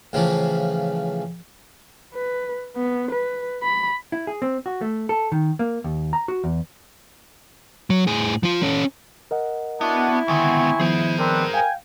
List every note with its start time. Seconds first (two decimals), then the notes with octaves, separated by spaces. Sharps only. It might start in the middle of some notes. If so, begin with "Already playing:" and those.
0.13 A2 C#3 E3 F3
2.14 B4
2.76 B3
3.11 B4
3.63 B5
4.12 E4
4.27 G#4
4.42 C4
4.66 F#4
4.81 A3
5.09 A4
5.32 D#3
5.59 A#3
5.84 D#2
6.13 A#5
6.28 F#4
6.44 E2
7.90 F#3
8.07 A2 G#4
8.43 F3 F4
8.63 C#4 A4
9.31 A#4 D#5 F#5
9.81 B3 D4 E4 F#4
10.28 C#2 D3 D#3 B3 C4 G#5 C#6
10.80 D#3 F3 B3 G#4 C5
11.19 C4 D4 A#4 B4
11.54 F5 G5 G#5